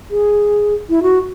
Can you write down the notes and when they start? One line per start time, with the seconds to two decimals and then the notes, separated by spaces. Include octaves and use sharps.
0.11 G#4
0.89 E4
1.03 F#4